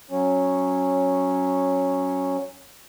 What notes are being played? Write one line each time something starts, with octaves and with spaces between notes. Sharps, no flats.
F#3 C#4